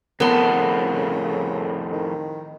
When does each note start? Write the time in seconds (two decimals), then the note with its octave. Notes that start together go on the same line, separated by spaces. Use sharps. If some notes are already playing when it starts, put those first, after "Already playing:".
0.20 F2 A2 C#3 B3 A#4 B4 A5 C6
1.93 D#3